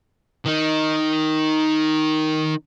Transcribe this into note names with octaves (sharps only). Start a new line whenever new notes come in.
D#3 D#4